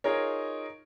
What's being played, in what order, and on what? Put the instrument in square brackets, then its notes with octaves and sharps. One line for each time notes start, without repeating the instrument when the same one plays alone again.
[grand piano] D#4 F4 G#4 A#4 C#5